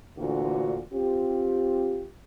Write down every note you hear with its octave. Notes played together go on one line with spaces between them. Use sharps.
D2 A#2 D3 E3 F#4
C4 F4 G4